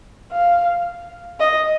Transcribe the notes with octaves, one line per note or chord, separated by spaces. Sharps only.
F5
D#5